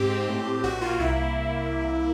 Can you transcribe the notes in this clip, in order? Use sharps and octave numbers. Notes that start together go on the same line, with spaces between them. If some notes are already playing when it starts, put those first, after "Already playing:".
Already playing: G#2 C4 G4
C4
A2
C4
A#1 F#4
A#3 F4
C2 E4